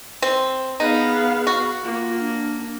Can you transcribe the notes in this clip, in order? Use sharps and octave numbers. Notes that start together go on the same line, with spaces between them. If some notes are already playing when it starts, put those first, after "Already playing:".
C4
B3 D#4 G#4 F5
F#4
A#3 F4
D4